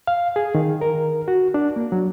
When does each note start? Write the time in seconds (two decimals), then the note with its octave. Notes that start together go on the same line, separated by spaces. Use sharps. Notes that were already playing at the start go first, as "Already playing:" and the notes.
0.07 F5
0.36 G#4
0.55 D#3
0.81 A#4
1.28 F#4
1.54 D4
1.76 A#3
1.92 F#3